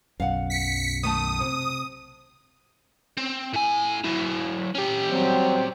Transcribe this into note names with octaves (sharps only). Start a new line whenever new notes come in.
B1 F#2 F5 F#5
B6 C#7
D#3 A3 A5 D#6
C3
C4
A2 G#5
F#3 E4
C#4 G4
F#3 G3 C4